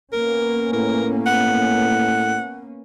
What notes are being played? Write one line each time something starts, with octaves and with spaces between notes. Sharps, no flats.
A#3 B3 C#4 A#4
A2 A#4
F#5